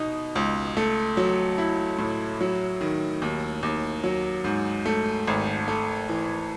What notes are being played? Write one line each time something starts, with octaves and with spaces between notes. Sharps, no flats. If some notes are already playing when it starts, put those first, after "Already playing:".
Already playing: B2 D#4
C#2
A3
F#3
E4
A2
F#3
D#3
D#2
D#2
F#3
G#2
A3
G#1
A3
E3